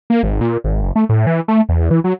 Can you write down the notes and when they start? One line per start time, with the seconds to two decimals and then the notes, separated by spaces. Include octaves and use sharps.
0.10 A#3
0.23 G#1
0.41 A#2
0.64 G#1
0.82 F#1
0.96 A3
1.09 A2
1.27 E3
1.48 A3
1.69 E2
1.91 E3
2.04 F#3